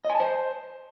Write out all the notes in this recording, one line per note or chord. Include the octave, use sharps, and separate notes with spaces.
D#5
G#5
A5
C5